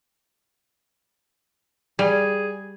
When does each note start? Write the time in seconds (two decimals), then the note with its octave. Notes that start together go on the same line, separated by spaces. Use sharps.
1.99 G3 G#4